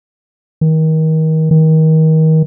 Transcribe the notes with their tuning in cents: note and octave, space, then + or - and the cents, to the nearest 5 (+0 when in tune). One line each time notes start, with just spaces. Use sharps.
D#3 +30
D#3 +30